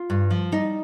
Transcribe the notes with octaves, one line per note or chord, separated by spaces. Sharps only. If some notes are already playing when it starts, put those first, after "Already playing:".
Already playing: F4
G2
F3
G3 D#4